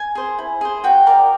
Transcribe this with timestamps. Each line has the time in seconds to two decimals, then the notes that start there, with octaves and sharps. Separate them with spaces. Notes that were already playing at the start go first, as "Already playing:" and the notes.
Already playing: G#5
0.15 G#4 C5
0.38 E4
0.61 G#4 C5
0.84 F#4 G5
1.07 A#4 D5